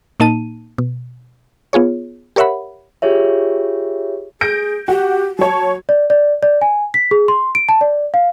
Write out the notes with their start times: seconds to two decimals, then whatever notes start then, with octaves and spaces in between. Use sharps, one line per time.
0.20 A#2 A#3 D#4 A5 D#7
0.78 B2
1.73 B3 F4 G#4 C#5
2.36 G4 A#4 C#5 E5 F#5 B5
3.02 F4 G4 G#4 C#5 E5
4.41 G#4 G6 A#6 D7
4.88 F#4 G4
5.39 F#3 C#5 A5
5.89 D5
6.10 D5
6.43 D5
6.61 G#5
6.94 B6
7.11 G#4
7.28 C6
7.55 D7
7.69 A5
7.81 D5
8.14 F5